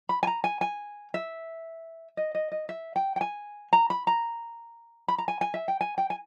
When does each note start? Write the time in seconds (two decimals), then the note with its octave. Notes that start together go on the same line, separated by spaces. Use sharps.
0.09 B5
0.23 G#5
0.27 A#5
0.44 G#5
0.61 G#5
1.14 E5
2.17 D#5
2.35 D#5
2.52 D#5
2.69 E5
2.96 G5
3.16 G5
3.21 G#5
3.73 A#5
3.90 B5
4.07 A#5
5.08 B5
5.18 A#5
5.28 G#5
5.41 G#5
5.54 E5
5.68 G5
5.81 G#5
5.98 G5
6.10 G#5